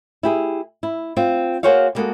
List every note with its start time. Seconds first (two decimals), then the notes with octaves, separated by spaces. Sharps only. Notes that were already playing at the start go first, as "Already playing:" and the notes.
0.23 E4 G4 G#4
0.83 E4
1.17 C4 F4
1.63 A#3 F#4 G#4 C5 C#5 F5
1.95 G3 G#3 A#3 B3 F#4 A4